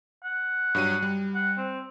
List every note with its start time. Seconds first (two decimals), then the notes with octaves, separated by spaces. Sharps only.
0.23 F#5
0.75 G2 F#3 D#7
1.02 G3
1.35 F#5
1.57 C4